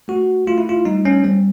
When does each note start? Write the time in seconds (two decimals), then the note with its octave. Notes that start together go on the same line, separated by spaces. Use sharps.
0.08 A3 F#4
0.47 A3 F4
0.58 E4
0.69 F4
0.85 G3 D#4
1.05 C#4
1.24 G3 C4